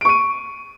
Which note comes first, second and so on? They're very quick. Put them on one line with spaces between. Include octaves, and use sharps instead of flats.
D7 C#6 D#7